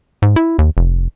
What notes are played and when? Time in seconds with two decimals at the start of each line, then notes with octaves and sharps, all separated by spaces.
0.22 G#2
0.36 E4
0.59 D#2
0.77 F1